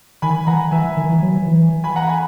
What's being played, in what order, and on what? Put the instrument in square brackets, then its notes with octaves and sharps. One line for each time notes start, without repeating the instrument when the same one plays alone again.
[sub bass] D#3 [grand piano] G#5 B5
[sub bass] E3 [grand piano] F#5 A#5
[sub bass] E3 [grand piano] E5 G#5
[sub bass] E3
D#3
E3
F#3
E3
[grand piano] G#5 B5
F#5 A#5
G#5 B5